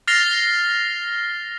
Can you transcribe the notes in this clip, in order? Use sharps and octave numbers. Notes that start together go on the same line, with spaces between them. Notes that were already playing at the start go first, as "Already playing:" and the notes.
F6 A6 A#6 C7 F7 G7